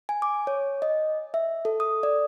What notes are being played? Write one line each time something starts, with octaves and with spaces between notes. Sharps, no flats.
G#5
D6
C#5
D#5
E5
A4
D#6
D5